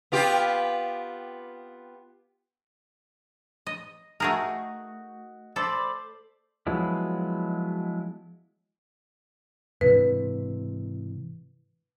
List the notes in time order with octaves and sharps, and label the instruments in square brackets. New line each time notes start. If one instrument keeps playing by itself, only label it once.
[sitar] B3 F4 G4
[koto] D#5
[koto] A3 G#4 A#4 [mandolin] D#4 F#4
[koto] A4 [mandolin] C5 D5 B5
[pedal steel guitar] F3 F#3 G#3 B3 E4
[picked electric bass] G#2 C3 E3 [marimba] B4